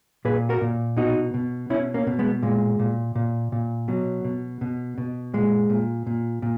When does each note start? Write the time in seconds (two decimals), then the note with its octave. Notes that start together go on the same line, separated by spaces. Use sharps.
0.25 A#2 G#4 B4
0.49 F#4 A#4
0.61 A#2
0.97 B2 D#4 F#4
1.34 B2
1.70 B2 C#4 E4
1.94 A#3 C#4
2.07 B2
2.19 G#3 B3
2.43 A#2 G#3
2.79 A#2
3.15 A#2
3.52 A#2
3.88 B2 F#3
4.25 B2
4.61 B2
4.98 B2
5.34 A#2 G#3
5.70 A#2
6.07 A#2
6.42 A#2